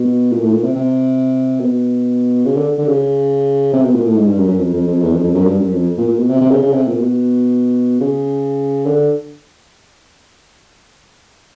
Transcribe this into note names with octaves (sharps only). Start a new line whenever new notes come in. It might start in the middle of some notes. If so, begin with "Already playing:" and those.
Already playing: B2
A#2
A2
A#2
C3
C3
B2
C#3
D3
D3
C#3
C3
B2
A#2
A2
G#2
G2
F#2
F#2
F2
F2
F2
E2
F2
F2
F#2
G2
F#2
F2
A#2
A#2
B2
C3
C3
C#3
C#3
C3
A#2
B2
C#3
D3